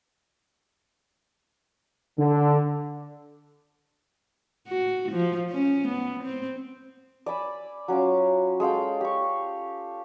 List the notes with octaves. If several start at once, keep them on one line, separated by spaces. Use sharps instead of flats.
D3
F#4
F3
C#4
B3
C4
D5 G#5 B5 E6
F#3 C#4 F4 D6
G#3 A4 F5 G5
G4 C#6